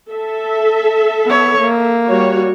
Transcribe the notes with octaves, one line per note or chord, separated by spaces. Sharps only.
A4 E5
B3 C#5
A#3
G3 F#4 C#5